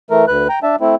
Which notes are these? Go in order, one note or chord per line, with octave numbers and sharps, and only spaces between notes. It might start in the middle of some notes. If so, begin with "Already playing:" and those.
E3 A3 A#4
D2 B4 F#6
G5 A#5
D4 E5 A5
A3 C4 E4